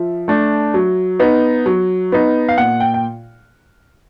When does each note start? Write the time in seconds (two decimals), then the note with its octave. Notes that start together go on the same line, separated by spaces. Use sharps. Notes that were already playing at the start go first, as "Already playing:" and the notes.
Already playing: F3 E5
0.28 A3 D4
0.74 F#3
1.20 B3 D#4
1.66 F#3
2.12 B3 D#4
2.49 F5
2.58 A#2 F#5
2.80 G5
2.94 G5